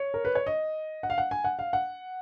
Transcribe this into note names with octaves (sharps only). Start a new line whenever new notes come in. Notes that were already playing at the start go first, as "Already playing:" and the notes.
Already playing: C#5
A#4
B4
C#5
D#5
F#5
F5
F#5
G#5
F#5
F5
F#5